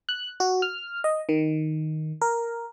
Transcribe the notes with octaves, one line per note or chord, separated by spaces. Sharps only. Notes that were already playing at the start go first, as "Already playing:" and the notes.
F#6
F#4
F6
D#5
D#3
A#4